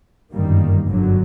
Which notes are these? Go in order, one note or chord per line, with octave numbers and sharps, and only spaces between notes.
G1 F#2 D#3 G3 A#3
G1 F#2 D3 F#3